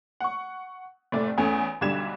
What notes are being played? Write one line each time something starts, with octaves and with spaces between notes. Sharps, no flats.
F#5 C#6
F1 A2 A3 D5
E2 A3 C#4
B1 D3 G3 G#6 E7